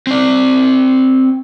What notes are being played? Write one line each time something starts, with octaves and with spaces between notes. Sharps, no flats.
C4 D5